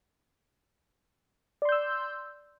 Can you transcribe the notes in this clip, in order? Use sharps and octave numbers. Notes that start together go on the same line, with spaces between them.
D5 C6 E6 G6